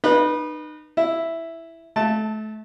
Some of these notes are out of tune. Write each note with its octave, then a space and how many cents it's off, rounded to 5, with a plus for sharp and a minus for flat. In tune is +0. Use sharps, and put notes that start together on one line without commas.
D#4 -35 B4 -20
E4 +0 E5 +0
A3 -30 A5 +0